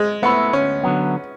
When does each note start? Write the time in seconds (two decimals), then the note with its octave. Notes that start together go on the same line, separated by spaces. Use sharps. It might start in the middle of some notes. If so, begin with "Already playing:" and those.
Already playing: G#3
0.22 A3 B3 E4
0.53 D2 C#4
0.84 D3 F#3 B3